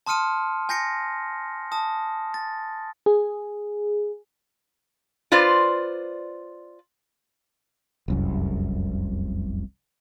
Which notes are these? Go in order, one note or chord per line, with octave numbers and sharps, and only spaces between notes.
A5 C6 D#6 F6 C#7 D#7
G#5 G6 A#6 C7 C#7
A5 D#6
A6
G#4
F4 B4 C5 D5
F1 C2 F#2